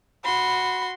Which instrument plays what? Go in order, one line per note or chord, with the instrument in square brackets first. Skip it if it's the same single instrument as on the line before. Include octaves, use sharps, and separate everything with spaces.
[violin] F#4 C6 [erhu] B5